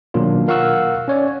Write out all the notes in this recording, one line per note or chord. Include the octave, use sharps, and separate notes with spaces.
B2 D#3 F#3 A#3 D4 F4
A#4 F5 F#5 C#6 E6 F#6
C#4 C#5 D5